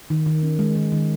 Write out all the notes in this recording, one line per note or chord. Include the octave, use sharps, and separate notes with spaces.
D#3
D#3
C#4
G#3
D#3
D#3